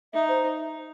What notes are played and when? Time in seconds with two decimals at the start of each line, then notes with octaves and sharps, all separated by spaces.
0.13 D#4 E5
0.29 C5